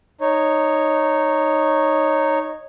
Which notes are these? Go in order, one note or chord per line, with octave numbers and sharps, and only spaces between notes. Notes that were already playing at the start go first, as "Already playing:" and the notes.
D#4 C#5